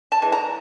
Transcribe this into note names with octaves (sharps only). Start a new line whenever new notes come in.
A5
E3 G#3
A#5